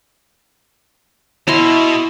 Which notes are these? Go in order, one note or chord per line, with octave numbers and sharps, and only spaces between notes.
B2 E4 E5 C6